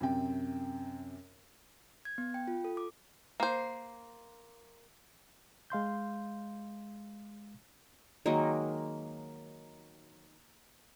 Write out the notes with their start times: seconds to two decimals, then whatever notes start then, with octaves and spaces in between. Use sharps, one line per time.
0.01 F#2 C3 G5
2.05 G#6
2.18 B3
2.34 G5
2.48 F4
2.64 A4
2.77 D6
3.40 A#3 C5
5.70 G#3 F5 C6 G6
8.26 D#3 F#3 G#3 A#3